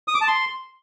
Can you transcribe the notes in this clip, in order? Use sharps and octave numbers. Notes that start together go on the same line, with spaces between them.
D#6
D6
A5
C6